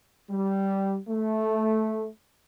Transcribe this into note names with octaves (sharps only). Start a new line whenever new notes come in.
G3
A3